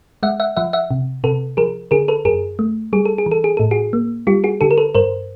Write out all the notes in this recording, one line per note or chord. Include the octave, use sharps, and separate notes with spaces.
G#3 E5 F#5
E5 F#5
F3 E5 F#5
E5 F#5
C3
C3 A4 B4
F3 G#4 A#4
D3 G#4 A#4
A4 B4
F#2 G#4 A#4
A3
G3 G#4
A4
G#4
E3
A4
G#4
A2 A4
F#4 G#4
A#3
G3 F4 G4
F#4 G#4
D3 G4 A4
A#4
A4 B4
G2 A#4 C5